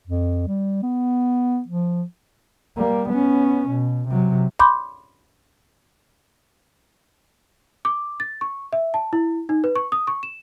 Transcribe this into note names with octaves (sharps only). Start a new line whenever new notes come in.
F2
G3
B3
F3
G3 A#3
B3 C#4
B2
C3 F#3
B5 C6 D6 G6
D6
A6
C#6
E5
A5
E4
D#4
B4
C#6
D#6
C#6
E7